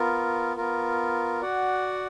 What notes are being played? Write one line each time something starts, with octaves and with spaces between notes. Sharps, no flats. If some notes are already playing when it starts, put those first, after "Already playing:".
Already playing: B3 F4 A#4
B3 F4 A#4
F#4 D5 F#5